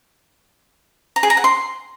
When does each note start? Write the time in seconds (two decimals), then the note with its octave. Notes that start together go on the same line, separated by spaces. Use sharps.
1.16 A#5
1.23 G#4
1.30 A#5
1.37 F#5
1.44 C6